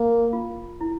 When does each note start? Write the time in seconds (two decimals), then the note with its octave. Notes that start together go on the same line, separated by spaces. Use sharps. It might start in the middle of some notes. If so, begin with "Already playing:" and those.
Already playing: A#3
0.33 F4
0.81 E4